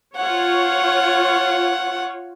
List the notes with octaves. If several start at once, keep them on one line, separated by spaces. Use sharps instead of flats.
F4 C#5 F#5